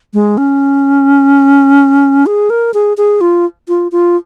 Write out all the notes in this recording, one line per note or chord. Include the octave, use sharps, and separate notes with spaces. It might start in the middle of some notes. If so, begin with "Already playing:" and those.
G#3
C#4
G#4
A#4
G#4
G#4
F4
F4
F4